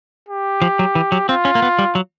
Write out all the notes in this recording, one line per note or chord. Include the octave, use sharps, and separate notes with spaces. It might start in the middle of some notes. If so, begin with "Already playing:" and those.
G4
F3
F#3
E3
F#3
C4 F4
C#4
A#3
B3
G3
F#3